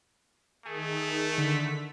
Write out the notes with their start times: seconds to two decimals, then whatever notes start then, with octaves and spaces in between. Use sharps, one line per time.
0.66 D#3 A3 G#4
1.38 D3 B6